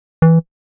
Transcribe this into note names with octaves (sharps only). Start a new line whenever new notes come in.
E3